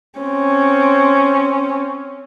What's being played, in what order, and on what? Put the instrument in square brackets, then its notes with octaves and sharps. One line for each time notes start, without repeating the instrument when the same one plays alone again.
[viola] C4 C#4